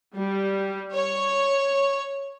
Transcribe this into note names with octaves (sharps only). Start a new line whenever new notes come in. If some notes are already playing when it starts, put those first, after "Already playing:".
G3
C#5